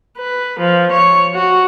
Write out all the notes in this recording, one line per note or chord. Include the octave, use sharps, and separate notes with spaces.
B4
F3
C#5
F#4